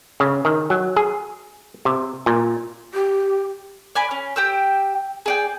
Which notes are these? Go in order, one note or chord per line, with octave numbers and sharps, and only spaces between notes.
C#3
D#3
F#3
G#4
C3
A#2
G4
D5 G#5 B5
C#4
G4 G5 E6
G#4 D5 G5